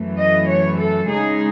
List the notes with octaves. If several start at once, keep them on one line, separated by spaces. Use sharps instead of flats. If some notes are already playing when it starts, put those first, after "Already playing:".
Already playing: F#2 E3 A3
D#5
C#5
A4
C#3 G#3 D#4 G#4